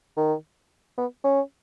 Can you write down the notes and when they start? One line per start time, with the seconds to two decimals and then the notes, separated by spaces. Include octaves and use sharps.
0.17 D#3
0.98 B3
1.24 C#4